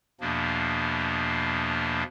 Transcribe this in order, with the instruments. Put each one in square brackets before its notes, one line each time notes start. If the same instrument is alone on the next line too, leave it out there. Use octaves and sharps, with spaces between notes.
[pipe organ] E2 B2 F3 A#3 D4